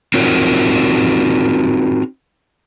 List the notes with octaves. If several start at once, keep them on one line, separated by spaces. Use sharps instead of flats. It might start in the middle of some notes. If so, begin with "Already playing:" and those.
C4 D#4 F4 F#4 A#4 C#5